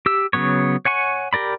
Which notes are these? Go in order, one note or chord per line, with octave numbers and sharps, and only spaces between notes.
G4 E6
C#3 F#3 B3 C#5
C#5 F#5 G#5 C#6
G4 A#4 D5 B5